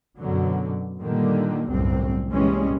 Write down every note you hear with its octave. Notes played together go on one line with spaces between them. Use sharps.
F#2 B2 D3 F#3
A#2 D3 D#3 G3 A#3
G1 C2 F#2 A2 C4
C2 A#2 E3 G3 G#3 C#4